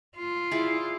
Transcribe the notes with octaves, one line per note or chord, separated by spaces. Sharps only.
F4
E4 G#4 D5